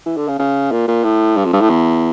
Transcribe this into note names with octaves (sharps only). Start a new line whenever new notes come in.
E3
D3
C#3
C#3
A#2
A#2
A2
G2
F2
G2
A2
E2